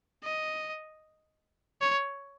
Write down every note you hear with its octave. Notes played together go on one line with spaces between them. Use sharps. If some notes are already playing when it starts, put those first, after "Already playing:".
D#5
C#5